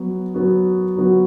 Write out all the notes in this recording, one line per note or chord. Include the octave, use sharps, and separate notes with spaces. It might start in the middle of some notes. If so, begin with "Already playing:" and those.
Already playing: F#3 B3 F#4
F#3 B3 F#4
F#3 B3 F#4